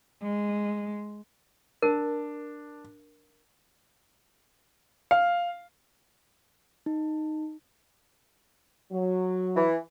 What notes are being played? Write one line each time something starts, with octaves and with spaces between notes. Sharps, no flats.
G#3
D4 A#4
F5
D#4
F#3
E3